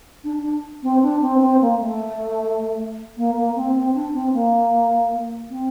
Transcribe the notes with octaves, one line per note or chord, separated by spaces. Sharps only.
D4
D4
C4
D4
C4
C4
A#3
A3
A#3
A#3
C4
C4
D4
C4
A#3
C4